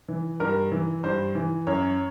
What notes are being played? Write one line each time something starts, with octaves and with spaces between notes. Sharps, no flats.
E3
G2 A#4
E3
G2 C5
E3
F#2 C#5